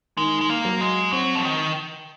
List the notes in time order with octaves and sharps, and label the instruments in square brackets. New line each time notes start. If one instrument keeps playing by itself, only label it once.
[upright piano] D#3 [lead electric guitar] G#3
[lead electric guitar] G#3
A#3
[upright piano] F#3
[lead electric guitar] G#3
[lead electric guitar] F#3 [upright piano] C4
[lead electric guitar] F3
D#3